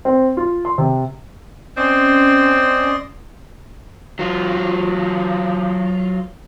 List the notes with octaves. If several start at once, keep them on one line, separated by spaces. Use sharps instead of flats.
C4
F4
C6
C3
C4 C#4 D5 D#5 C6
F#3 F4